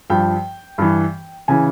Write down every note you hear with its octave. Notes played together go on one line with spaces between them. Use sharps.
G2 F3 G5
G2 E3
C#3 E3 G#5